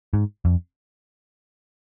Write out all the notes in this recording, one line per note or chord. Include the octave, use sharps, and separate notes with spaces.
G#2
F2